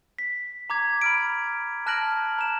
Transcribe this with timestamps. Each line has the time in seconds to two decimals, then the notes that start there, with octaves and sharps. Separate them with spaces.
0.19 B6
0.70 A#5 D6 G#6
1.01 B5 F6 D7
1.86 A5 F6 F#6 A#6 D7 F#7
2.38 A#5 E7